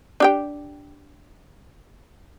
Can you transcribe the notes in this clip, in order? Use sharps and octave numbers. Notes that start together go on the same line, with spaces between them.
D4 G4 G5